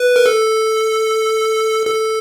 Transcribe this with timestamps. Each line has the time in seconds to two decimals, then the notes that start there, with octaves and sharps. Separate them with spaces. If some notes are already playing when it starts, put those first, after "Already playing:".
Already playing: B4
0.16 A#4
0.26 A4
1.87 A4